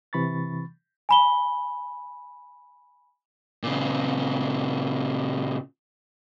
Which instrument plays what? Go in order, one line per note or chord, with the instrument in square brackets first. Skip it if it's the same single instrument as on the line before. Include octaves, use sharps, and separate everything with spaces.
[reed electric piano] C3 E3 B5 C#6 A6
[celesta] G#5 B5 G7
[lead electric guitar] A#2 C#3